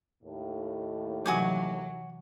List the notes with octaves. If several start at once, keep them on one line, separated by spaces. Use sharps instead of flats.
D#2 A2
C3 E3 F#3 F#4 G#5 D6